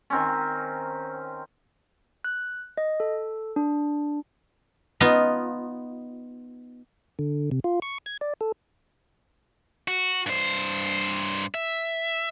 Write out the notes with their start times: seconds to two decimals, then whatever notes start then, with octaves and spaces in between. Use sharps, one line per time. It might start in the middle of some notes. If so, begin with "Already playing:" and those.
0.10 D#3 C4 C#4
2.24 F#6
2.77 D#5
3.00 A4
3.56 D4
5.00 B3 D#4 F4
7.19 D3
7.51 C3
7.64 F4
7.82 C#6
8.06 G#6
8.21 D5
8.41 A4
9.88 F#4
10.26 G2 C5
11.54 E5